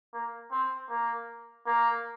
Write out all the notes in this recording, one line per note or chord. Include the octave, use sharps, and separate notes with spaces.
A#3
C4
A#3
A#3